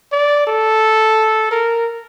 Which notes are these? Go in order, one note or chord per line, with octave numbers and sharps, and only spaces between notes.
D5
A4
A#4